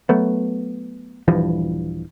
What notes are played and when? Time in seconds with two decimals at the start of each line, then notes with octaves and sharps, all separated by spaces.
0.09 F#3 A3 B3
1.28 D#1 G2 E3 F3